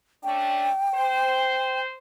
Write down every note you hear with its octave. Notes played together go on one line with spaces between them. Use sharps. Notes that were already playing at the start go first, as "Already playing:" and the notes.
A3 C#4 D4 G5
C5